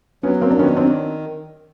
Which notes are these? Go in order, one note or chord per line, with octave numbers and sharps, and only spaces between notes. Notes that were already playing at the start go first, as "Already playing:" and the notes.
F#3 B3 C#4
A#3 C4
D4
D#3 B3 C#4
C4 D4